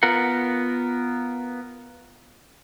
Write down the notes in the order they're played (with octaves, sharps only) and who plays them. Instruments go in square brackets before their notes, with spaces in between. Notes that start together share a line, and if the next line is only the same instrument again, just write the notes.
[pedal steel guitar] B3 F4 A#4 F#5